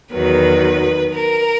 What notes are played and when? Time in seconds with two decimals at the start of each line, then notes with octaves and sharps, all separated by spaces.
0.13 E2 D#3 F#3 B4
1.13 A#4